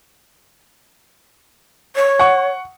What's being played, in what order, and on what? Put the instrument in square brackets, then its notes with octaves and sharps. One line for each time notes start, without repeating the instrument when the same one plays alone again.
[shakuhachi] C#5
[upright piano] F#5 C#6